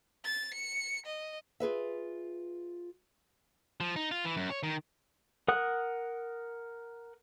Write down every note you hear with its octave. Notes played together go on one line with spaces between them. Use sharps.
A6
C#7
D#5
F4 G#4 B4 E5
F3
D#4
F4
E3
F#2
C#5
D#3
A#4 F#5 D#6 F#6